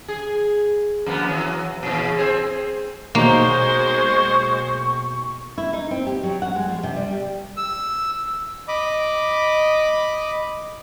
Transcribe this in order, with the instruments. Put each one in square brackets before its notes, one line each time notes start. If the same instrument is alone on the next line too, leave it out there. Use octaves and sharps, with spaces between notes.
[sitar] G#4
F2 A#3 B3
E3 F#3
A#2 C#3 E3
C4 G#4 C5
[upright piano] B1 D#4 [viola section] G#3 C5 [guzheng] A#3 [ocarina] C#6
[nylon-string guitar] E4
D#4
C4
G4
F#3
F#5
G#3
F3
C3
G3
G4
[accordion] E6
[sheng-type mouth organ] D#5 B5 D6